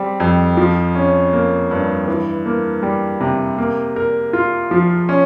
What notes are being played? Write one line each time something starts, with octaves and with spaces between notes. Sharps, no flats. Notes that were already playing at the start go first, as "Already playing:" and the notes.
Already playing: G3 C4
F2
F3
C#4
A#3
G2
E3
A#3
G3
C3
A#3
A#4
F4
F3
C#4